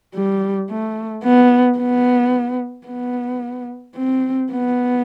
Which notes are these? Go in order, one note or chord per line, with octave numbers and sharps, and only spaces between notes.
G3
A3
B3
B3
B3
C4
B3